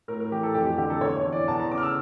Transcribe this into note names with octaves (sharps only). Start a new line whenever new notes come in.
A2 A#4
A#4
E3 G4
A4
F2 G4
G4
D3 G4
A4
E2 C#5
C#5
E3
D5
E2 A5
A#5
C#3 D6
F6
E6